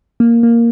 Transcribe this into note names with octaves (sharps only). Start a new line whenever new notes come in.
A#3
A#3